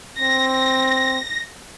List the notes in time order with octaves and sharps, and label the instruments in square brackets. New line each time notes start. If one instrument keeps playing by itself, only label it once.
[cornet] C4 [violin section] A#6